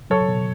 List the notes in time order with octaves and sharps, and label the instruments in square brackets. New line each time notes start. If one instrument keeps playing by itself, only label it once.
[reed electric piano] F#3 [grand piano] A4 C#5
[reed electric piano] B2